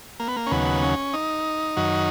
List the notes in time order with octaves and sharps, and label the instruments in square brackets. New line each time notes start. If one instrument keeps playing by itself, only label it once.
[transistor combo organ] A#3
B3
A#3
C#4
D#2 C#3 F#3 B3
C#4
D#4
F#2 D#3 F#3